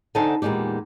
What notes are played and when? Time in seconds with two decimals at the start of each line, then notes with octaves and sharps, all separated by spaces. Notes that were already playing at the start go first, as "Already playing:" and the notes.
0.15 D3 D#4 C5 F#5 G#5 A5
0.42 E2 A#2 G#3 D#4 G4